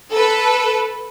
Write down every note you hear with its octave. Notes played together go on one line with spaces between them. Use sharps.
A4 B4